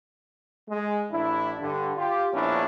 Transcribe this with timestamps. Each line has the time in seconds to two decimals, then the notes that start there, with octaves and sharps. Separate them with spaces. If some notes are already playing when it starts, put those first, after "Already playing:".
0.69 G#3
1.12 A1 D4 E4
1.60 G2 D3
1.97 F4 G4
2.33 A#1 B3 C#4 D4 E4